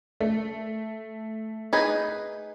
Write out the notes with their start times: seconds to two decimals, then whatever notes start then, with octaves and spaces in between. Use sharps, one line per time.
0.20 A3
1.73 D#4 G#4 B4